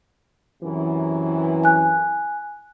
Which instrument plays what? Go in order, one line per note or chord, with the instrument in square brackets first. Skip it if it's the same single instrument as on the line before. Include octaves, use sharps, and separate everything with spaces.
[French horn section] F#2 C3 E3
[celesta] G#5 F#6